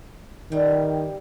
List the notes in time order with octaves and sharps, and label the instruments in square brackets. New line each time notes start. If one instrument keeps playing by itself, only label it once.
[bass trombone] D#3 [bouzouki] E3 G3 G5